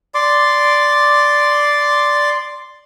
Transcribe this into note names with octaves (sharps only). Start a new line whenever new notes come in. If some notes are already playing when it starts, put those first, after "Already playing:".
D5 C6 D6